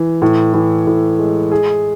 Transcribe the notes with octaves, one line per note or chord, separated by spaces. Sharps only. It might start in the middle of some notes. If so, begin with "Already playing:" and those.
Already playing: E3
A2
E3
A2
G#3
G#4